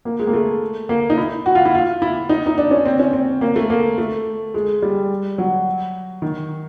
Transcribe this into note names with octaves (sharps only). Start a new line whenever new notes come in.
A#3
G#3
A#3
A3
A#3
D#4
E4
F#4
F4
E4
F4
E4
D#4
D#4
D4
C#4
C4
C#4
C4
A#3
A3
A#3
A3
G#3
G3
F#3
D#3